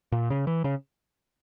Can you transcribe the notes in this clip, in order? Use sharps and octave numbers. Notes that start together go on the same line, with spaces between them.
A#2
C#3
E3
C#3